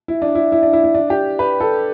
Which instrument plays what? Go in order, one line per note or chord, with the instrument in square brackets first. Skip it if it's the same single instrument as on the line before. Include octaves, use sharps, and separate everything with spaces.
[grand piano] E4
D4
E4
E4
D4
E4
E4
D4
G4
B4
A4